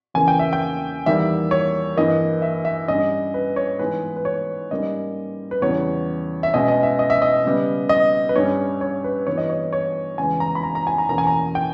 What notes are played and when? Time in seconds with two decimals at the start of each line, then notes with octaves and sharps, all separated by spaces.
0.14 E2 C#3 E3 A#3 G#5
0.28 G5
0.39 E5
0.53 G5
1.06 E2 D#3 G3 A#3 E5
1.51 C#5
1.97 G2 E3 A#3 D#5
2.42 E5
2.65 E5
2.88 G2 G3 C#4 D#5
3.34 B4
3.56 C#5
3.79 G#2 E3 G#3 B3 B4
4.16 B4
4.25 C#5
4.71 G#2 G3 A#3 C#4 D#5
5.51 B4
5.62 E2 C#3 E3 G3 B3 C#5
6.43 E5
6.54 B2 G#3 C#4 D#5
6.68 D#5
6.83 E5
6.99 D#5
7.10 E5
7.22 D#5
7.45 C#3 G3 B3
7.89 D#5
8.29 B4
8.36 G2 G3 C#4 C#5
8.81 C#5
9.04 B4
9.27 G2 E3 G3 B3 C#5
9.38 D#5
9.50 C#5
9.73 C#5
10.18 E2 C#3 G#3 B3 G#5
10.40 A#5
10.55 B5
10.63 A#5
10.75 A#5
10.87 G#5
10.98 A#5
11.09 E2 B2 A#3 C#4 A#5
11.18 G#5
11.27 A#5
11.55 G5